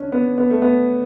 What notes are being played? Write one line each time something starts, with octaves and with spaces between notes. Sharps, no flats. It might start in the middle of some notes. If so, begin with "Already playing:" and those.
Already playing: C#2 C#4 D4
B3
B3
A3
B3